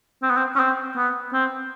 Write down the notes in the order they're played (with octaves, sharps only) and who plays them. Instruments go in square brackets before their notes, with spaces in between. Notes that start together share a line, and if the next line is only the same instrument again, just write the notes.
[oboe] C4
B3
C4
C#4
C4
B3
C4